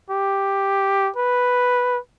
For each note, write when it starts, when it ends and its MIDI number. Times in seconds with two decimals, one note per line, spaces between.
0.10 1.10 67
1.16 1.98 71